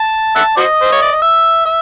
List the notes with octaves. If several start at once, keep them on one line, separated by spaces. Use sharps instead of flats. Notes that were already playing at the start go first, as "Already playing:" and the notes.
Already playing: A5
E5 F#5 A5
F#4 C5 D#5
C5
C#5
D5
D#5
E5
E5